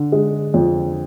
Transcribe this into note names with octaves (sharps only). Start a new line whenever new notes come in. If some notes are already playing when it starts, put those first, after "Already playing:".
Already playing: D3
G#3
F2